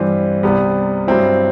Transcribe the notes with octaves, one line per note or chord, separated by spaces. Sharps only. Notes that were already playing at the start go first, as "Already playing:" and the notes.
Already playing: G2 E3 G3 C4
C2 C3 G3 B3
G2 F#3 C4 E4